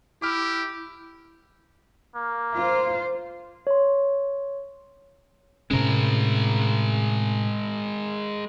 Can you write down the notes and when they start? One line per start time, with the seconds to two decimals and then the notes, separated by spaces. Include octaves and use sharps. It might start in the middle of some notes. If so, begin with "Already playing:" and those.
0.22 E4 G4 D6 F6
2.15 A#3
2.55 F4 C5
3.67 C#5 C6
5.71 A2 C3 G#3 C#4 A#4